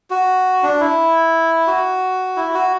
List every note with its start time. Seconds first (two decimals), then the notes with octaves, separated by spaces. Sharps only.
0.10 F#4
0.63 D4
0.80 E4
1.67 F#4
2.37 E4
2.54 F#4